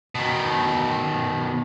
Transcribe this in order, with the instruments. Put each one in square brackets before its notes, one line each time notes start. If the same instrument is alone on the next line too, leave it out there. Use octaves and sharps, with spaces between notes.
[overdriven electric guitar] B2 D#3